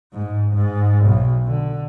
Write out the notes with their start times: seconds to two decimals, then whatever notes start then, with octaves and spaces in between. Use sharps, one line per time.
0.13 G#2
0.54 G#2
1.05 B1
1.45 D3